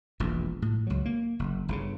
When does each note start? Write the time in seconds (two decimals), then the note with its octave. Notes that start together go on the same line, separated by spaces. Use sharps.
0.20 E1 A#1 E2
0.62 A2
0.87 C#2 F#3
1.05 A#3
1.39 F#1
1.69 G1 A#2 C#3